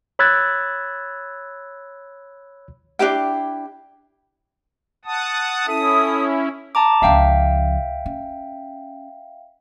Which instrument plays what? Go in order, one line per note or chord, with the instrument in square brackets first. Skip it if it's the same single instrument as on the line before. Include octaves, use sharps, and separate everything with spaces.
[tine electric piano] C#5 B5 E6 F#6 G#6 A6
[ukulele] D4 E4 G4 G5
[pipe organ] F#5 A5 D#6
[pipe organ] C#4 E4 [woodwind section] A4 E5 D#6
[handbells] A5 A#5 D6
[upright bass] C#2 F3 [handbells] E5 F5 G5
[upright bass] C#4